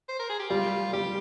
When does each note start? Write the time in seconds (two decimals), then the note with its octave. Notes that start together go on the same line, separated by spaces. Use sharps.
0.09 C5
0.19 A#4
0.29 G#4
0.40 G4
0.50 G3 F4
0.93 G3 G4